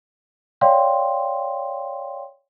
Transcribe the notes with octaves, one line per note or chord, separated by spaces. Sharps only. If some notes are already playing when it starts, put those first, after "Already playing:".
C#5 D5 F5 G5 C6